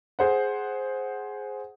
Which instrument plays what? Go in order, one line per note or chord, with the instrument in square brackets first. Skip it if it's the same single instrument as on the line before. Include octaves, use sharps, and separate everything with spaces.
[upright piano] G#4 C5 F#5